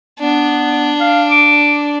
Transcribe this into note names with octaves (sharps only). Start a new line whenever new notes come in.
B3 D4
F5
D6